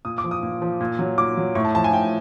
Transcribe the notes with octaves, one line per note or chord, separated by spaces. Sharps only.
A#2 D#6
D6
F3
D#6
A#2
F3
A#2
F#3
A#2 D6
F#3
A2 C#6
A5
F3 A5
G#5
A2 G5